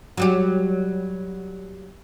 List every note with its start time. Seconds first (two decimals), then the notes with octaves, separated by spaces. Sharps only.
0.17 F#3 G3 G4